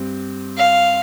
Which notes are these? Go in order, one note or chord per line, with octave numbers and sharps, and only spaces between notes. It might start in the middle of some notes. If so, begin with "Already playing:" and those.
Already playing: G2 C4
F5